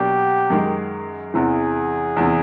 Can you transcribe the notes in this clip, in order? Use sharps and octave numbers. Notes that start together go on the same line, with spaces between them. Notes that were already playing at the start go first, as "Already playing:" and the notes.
Already playing: B2 F#3 A#3 D4 G4
F#2 D#3 G#3
E2 C3 E3 G#4
E2 C3 E3